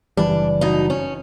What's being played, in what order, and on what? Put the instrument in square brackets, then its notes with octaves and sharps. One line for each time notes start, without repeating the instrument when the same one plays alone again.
[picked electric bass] F#1 E3 G3 [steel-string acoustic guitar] D4
[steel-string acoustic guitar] B2 D#4
C#4